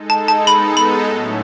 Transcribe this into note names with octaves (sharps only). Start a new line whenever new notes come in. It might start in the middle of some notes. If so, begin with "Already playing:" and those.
Already playing: G#3 D#4 A4
A5
A5
G#3 B3 D#4 A4 B5
B5
A2 F#3 A3 C#4